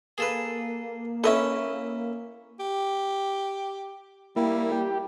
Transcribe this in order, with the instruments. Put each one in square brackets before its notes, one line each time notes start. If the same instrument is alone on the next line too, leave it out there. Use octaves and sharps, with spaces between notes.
[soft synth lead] A#3 [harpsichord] G#4 A4 B4
[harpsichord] C#4 E4 B4 [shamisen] A4 D#5 E5
[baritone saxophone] G4
[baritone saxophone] G3 [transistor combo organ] A#3 E4
[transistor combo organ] G4